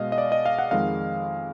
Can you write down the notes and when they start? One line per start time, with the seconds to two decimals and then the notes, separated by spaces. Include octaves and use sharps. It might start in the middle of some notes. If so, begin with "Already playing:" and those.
Already playing: B2 G#3 D#5 F5
0.12 D#5
0.18 D5
0.32 D#5
0.46 F5
0.59 F#5
0.71 F2 D#3 G#3 F5